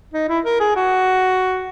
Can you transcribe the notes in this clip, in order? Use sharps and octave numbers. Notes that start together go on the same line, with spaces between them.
D#4
E4
A#4
G#4
F#4